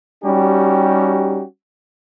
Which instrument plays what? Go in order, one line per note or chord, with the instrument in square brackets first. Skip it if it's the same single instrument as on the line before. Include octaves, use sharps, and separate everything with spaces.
[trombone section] G3 C#4 D#4 F#4 G4